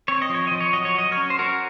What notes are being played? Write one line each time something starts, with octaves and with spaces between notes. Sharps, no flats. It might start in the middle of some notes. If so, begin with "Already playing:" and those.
C4 C#5
D#5
F3
C#5
F3 D#5
C#5
F#3 D#5
C#5
F#3 D#5
A#4 C#5
C#4
C5
C#4 F#4 A#4